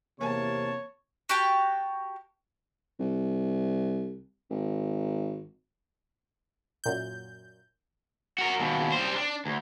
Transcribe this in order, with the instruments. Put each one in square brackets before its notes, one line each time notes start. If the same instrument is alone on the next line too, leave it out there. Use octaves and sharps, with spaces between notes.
[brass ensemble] E2 C3 [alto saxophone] A#3 [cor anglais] C#5 [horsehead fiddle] A5
[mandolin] F#4 G4 G5 A5
[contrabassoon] C2
G#1
[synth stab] F#2 A#2 G6
[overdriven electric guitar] F#4 A#4
D#2 B2
G3 C5
D4
D2